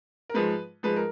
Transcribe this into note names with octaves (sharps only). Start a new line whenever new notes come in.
A#4
G#2 F3 G#3 B4
G#2 F3 G#3 B4
A#4